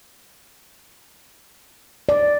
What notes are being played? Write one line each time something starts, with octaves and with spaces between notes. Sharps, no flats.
D5